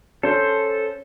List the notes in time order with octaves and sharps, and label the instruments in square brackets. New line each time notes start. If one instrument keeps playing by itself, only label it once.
[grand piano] C#4 [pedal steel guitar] A4 C5